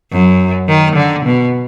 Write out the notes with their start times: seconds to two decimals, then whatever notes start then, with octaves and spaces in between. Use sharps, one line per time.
0.11 F#2
0.68 D#3
0.96 D3
1.25 B2